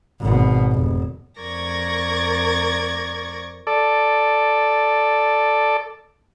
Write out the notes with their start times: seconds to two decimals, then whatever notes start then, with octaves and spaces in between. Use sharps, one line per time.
0.21 G#1 B2
0.72 F1
1.41 F2 A#4 D5 C#6 G#6 A#6
3.67 A4 D5